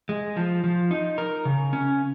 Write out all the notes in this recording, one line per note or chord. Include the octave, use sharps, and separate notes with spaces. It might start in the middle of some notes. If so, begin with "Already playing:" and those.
G#3
F3
F3
D#4
A#4
C#3
C#4